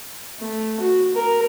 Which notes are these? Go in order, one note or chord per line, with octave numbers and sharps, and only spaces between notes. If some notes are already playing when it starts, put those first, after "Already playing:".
A3
F#4
A#4